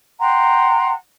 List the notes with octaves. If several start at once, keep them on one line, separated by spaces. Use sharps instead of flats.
F#5 G5 A#5 C6